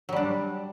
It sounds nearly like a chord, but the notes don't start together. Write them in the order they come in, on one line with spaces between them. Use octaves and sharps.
F#3 G3 D4